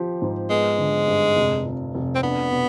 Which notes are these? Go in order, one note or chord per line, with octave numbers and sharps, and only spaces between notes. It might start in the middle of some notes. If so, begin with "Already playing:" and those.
Already playing: F3 G4
G#2
G#3 B3
D3
G2
F1
F2
F1
C4
B3 D4
B2